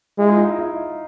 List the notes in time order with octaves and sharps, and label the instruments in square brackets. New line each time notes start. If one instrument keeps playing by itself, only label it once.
[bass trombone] G#3 [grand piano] E4
[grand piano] D#4 F4
D#4
E4
E4